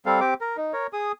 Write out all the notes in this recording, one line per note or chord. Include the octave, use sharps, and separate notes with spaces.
G3 C4 A4 F5
C4 G4 D6
A#4
D#4
A#4 C#5
G#4 D#6